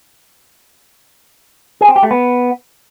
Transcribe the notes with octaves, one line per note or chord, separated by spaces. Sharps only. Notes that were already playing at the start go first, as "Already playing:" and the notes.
G#4
C4
G4
A3
B3